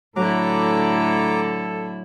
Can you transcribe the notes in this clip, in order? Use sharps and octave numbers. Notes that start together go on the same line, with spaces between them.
A2 D3 F#3 E4 A4 A#5 D6